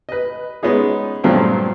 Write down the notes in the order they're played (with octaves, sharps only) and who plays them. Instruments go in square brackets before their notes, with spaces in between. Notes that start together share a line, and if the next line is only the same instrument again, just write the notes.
[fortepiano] B4 D#5
G#3 B3 C#4 D#4 G#4
G2 A#2 F3 F#3 A3 C4